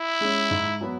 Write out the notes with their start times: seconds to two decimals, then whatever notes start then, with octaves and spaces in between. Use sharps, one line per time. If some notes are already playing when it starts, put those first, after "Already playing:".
Already playing: E4
0.21 G#3 C#4
0.51 G#2
0.81 F#3 B3